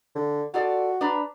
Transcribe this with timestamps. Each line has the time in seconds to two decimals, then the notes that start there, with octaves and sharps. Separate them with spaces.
0.15 D3
0.54 F4 F#4 A4 D5
1.01 D4 B4 A#5